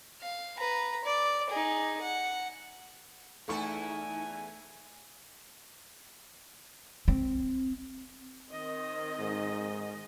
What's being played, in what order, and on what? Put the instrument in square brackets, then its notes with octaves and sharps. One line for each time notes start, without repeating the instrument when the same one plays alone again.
[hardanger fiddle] F5
B4 A#5
D5
D#4 G#4
F#5
[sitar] E2 E4 A4 [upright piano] A3 C#6 [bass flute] D#4 [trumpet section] G#5
[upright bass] C4
[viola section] D#3 C4 D#5
[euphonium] G#2